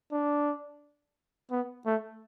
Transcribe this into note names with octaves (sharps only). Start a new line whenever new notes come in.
D4
B3
A3